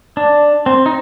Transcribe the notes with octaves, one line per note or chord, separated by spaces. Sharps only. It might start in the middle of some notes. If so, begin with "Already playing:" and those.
D4
C4
D#4